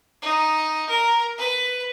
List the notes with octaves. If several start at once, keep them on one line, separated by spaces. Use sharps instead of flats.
D#4
A#4
B4